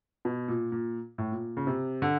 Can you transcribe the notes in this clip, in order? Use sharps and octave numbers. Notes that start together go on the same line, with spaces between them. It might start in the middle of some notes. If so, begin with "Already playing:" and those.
B2
A#2
A#2
A2
A#2
C#3
C3
D3